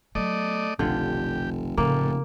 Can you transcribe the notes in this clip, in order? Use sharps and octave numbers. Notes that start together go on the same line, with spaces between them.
F#3 A3 B3 D5 D#5
F1 B1 D3 D#3 F4 G4
F1 A2 C#3 A#3